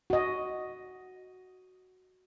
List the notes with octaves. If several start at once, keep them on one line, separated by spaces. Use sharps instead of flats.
F#4 D#5